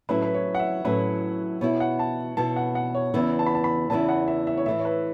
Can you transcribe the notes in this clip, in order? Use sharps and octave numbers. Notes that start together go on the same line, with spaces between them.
A2 F#3 C#4 E4 B4
B4
C#5
F#5
E5
A2 F#3 C#4 E4 B4
B2 B3 E4 C#5
F#5
A5
B2 B3 E4 A5
F#5
F#5
C#5
E2 C#3 E3 B3 E4
A5
B5
A5
B5
E2 C#3 E3 B3 E4 A5
F#5
E5
E5
C#5
A2 E3 A3 E5
C#5
B4